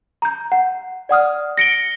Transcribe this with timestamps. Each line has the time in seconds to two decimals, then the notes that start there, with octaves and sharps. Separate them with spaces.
0.22 A#5 G6
0.52 F#5
1.09 D5 F#5 D#6 F6
1.57 A#6 C#7 D7 G7